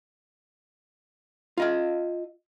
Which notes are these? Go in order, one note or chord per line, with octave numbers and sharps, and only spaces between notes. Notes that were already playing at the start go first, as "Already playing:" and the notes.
F4 D#5 F5